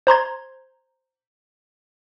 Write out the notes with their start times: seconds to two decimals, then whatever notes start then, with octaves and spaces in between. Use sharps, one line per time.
0.07 C5 A#5 C6 G#6